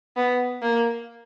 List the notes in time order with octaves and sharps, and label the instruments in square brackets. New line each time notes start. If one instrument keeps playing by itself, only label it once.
[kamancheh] B3
A#3